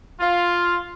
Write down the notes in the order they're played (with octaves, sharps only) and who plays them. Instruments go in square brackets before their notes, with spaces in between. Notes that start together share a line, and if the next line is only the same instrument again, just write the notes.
[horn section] F4